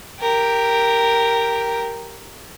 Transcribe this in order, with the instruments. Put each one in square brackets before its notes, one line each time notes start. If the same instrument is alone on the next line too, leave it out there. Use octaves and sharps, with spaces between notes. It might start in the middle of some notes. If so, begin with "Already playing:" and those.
[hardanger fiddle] G4 A#4